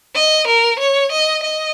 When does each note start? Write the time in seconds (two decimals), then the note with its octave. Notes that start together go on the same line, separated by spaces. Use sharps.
0.15 D#5
0.47 A#4
0.79 C#5
1.12 D#5
1.43 D#5